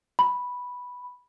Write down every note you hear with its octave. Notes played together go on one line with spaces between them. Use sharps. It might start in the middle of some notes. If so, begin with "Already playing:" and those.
B5